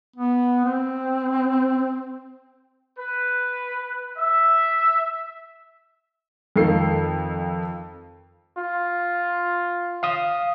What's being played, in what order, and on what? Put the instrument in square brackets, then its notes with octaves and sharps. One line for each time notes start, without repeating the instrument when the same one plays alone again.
[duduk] B3
C4
[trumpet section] B4
E5
[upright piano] F2 D#3 F4 A4 C7
[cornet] F4
[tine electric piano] F5 D#6